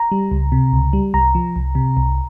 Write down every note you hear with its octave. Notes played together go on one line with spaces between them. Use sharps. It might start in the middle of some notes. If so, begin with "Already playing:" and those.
Already playing: A#5
G3
C#2
C3
C#2
G3
C2 A#5
F3
C2
C3
C2